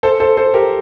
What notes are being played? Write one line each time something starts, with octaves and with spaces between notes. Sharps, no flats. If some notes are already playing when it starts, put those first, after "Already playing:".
A4 C5
A4 C5
A4 C5
G4 A#4